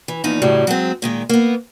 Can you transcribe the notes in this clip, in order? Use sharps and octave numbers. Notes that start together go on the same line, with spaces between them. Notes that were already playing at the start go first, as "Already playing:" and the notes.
E3
E2 A#2 F3 D#4
F2 A2 C#3 F#3 G3
F#3 G#3 C4
A#2 D#3 G#3
A#3 B3